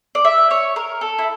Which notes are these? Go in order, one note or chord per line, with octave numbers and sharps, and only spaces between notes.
D5
E5
C#5
A#4
A4
E4